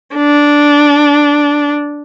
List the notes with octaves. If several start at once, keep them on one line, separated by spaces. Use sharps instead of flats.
D4